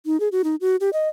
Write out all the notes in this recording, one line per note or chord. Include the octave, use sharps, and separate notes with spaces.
D#4
G#4
F#4
D#4
F#4
G4
D#5